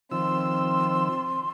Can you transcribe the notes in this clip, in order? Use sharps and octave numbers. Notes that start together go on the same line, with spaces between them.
D#3 F3 C4 C6 E6